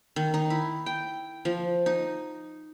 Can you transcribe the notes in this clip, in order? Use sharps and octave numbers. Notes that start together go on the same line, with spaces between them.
D#3
D#4
E4
G5
F3
D#4